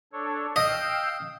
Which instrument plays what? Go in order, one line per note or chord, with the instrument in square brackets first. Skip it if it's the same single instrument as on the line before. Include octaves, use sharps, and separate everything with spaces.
[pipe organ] D4 A4 C#5
[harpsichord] D#5 [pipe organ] F5 G5 E6